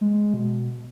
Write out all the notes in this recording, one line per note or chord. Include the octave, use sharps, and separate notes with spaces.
G#3
B2